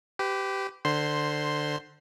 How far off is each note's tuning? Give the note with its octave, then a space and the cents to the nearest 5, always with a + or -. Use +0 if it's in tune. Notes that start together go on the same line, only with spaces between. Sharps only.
G4 -10 B4 +35
D3 +20 C5 +0 C6 +5